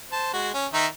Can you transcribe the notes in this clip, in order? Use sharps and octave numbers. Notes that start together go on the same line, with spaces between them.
C5 A5
G#3 F#4
C#4
D#3 D#4 E5